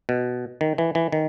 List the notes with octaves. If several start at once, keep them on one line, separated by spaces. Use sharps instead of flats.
B2
D#3
E3
E3
D#3